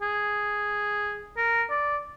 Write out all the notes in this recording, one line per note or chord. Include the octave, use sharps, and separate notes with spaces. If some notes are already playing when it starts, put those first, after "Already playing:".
G#4
A#4
D5